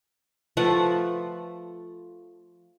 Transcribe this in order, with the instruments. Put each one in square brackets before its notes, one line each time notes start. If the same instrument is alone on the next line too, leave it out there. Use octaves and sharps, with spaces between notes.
[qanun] F3 A3 B4 F#5